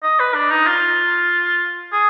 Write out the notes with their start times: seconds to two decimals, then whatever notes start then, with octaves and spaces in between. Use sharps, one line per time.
0.03 D#5
0.19 B4
0.34 D4
0.51 D#4
0.66 F4
1.92 G#4